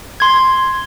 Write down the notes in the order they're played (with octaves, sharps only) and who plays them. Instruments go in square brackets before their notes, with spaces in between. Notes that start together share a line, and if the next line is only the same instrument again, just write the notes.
[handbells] C6 G#6